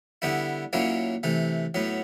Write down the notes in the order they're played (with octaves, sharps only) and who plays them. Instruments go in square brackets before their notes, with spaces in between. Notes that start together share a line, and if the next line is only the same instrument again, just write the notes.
[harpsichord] D3 G3 B3 E4
A#2 F#3 A#3 C#4 E4
C3 E3 A3
A2 F#3 B3